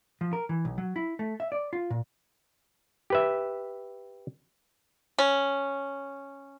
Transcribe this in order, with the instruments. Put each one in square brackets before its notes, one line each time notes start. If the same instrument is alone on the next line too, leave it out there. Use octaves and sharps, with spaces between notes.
[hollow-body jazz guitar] F3
A#4
E3
B1
F#3
E4
A3
E5
D5
F4
A#2
[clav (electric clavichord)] G4 B4 E5
[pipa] C#4